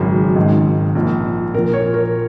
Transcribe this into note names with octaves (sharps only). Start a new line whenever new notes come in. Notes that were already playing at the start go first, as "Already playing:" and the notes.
Already playing: G#1 F#2 C#3
G#1 G#2 D#3
A#1 A#2
A#1 A#2 A#4
C#5
A#4